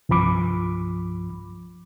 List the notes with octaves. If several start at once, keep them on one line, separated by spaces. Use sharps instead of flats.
C2 G2 F3 B5 D6